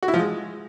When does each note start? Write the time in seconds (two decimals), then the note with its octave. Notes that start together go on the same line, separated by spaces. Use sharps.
0.03 F#4
0.08 E4
0.14 F3
0.19 G#3